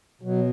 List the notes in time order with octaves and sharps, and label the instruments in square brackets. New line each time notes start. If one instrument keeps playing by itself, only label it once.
[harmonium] B2 F#3